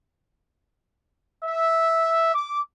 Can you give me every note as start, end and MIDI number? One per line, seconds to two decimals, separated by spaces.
1.44 2.30 76
2.35 2.61 86